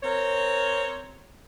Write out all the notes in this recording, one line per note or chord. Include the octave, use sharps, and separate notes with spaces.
C4 A#4 C#5